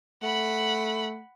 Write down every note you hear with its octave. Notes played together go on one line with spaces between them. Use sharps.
A3 F#5 B5